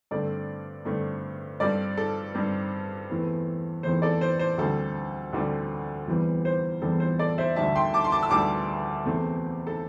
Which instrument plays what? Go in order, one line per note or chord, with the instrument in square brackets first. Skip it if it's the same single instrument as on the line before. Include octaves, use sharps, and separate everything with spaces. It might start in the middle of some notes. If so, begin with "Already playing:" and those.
[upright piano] G2 D3 A3 C4 A4 D5
G2 D3 A3 C4
G2 G3 C4 A4 D5
A4
G2 G3 C4
E2 E3 A3 C4
E2 E3 A3 C4 C5
A4 D5
C5
C5
D2 D3 G3 C4 A4
D2 D3 G3 C4
E2 E3 G3 C4
C5
E2 E3 G3 C4 A4
C5
A4 D5
C5 E5
D2 D3 G3 E5 A5
G5 C6
A5 D6
C6
A5 D6
E6
D2 D3 G3 A5 D6
E2 C3 A3 C4
A4